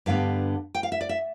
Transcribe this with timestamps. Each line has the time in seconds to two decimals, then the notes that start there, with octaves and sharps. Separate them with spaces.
0.06 G2 D3 G3 B3 F5
0.75 G5
0.83 F5
0.92 E5
1.01 D5
1.09 E5